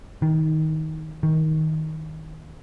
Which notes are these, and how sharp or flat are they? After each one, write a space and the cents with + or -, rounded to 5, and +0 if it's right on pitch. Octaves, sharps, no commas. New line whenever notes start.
D#3 +15
D#3 +15